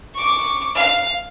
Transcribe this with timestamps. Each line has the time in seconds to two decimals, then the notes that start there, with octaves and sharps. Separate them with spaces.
0.15 C#6 D6
0.75 F5